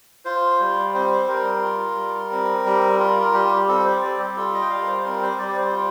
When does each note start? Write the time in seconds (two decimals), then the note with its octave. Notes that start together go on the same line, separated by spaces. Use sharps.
0.25 F4 C5
0.60 G3
0.94 C4 C5
1.28 G3 A#4
1.62 F4
1.97 G3
2.31 C4
2.66 G3
2.99 F4 A#4
3.33 G3 G4
3.56 G4
3.68 C4 A4
3.85 C5
4.02 G3 D5
4.19 G4
4.36 F4 A4
4.54 D#5
4.62 G5
4.70 G3 F5
4.82 A#4
4.87 C5
5.04 C4 A#4
5.22 C5
5.38 G3 D5
5.48 D5
5.57 C5
5.73 F4